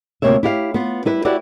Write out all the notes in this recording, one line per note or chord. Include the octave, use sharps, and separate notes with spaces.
D2 C3 A#3 C#5 E5
E4 G4 F5
B3 F4
G3 E4 B4
E4 F#4 G4 B4 D5 E5